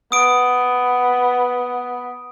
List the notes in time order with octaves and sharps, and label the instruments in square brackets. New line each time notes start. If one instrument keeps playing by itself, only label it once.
[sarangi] B3 [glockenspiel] D#6 D7